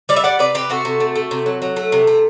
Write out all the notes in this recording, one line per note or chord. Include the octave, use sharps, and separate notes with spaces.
G3 D5
E5
G3 D5 F#5
C3 B4 D5
C3 G4 B4
C3 F#4 A4
C3
A3
A3
C3
F#3
F#3
A3
C3
A3